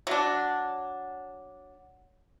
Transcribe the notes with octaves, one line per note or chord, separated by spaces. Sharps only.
F#3 D4